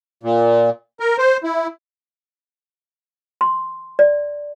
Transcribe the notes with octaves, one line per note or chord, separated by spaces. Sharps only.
A#2
A#4
C5
E4
C6
D5